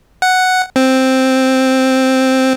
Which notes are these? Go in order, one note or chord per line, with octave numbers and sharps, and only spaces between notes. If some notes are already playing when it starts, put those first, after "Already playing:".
F#5
C4